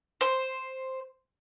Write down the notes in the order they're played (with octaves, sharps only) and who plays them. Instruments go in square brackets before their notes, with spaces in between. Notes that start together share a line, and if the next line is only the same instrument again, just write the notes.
[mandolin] C5